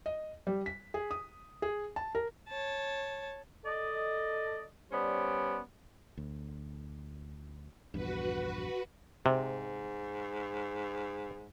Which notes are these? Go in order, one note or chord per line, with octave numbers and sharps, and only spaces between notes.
D#5
G3
B6
G#4
D#6
G#4
A5
A#4
C#5 A5
A4 D5 D#5
G3 B3 C#4 C5 D5
D2
A#1 E2 G2 F#4 B4
G#2 C3